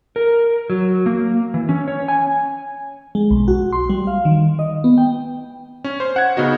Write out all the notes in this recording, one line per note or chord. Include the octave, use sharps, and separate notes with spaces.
A#4
F#3
A#3
E3
C#4
C#5
G#5
G#3
B1
F#4
C6
G3
F5
D#3
D#5
B3
G5
C#4
C5
F#5 G#6
C#3 B3 D#4 F#4